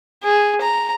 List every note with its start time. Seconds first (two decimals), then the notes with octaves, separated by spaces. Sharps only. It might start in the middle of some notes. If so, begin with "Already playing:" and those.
0.23 G#4
0.61 A#5